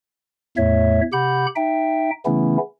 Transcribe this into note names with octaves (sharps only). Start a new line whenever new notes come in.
E2 A2 A3 C#5 E5
C3 G4 F#5 B5 G6
D#4 E5 G5
C#3 E3 A3 B3 C#4 E4